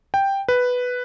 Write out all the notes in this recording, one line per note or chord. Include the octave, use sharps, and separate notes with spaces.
G5
B4